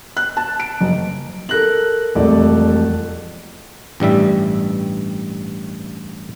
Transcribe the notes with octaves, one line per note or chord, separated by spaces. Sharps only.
F#6
A5
D7
F#1
A4 A#4 F#6 A#6 F#7
E1 F2 G3 A3 A4 D5
A1 G2 G3 E5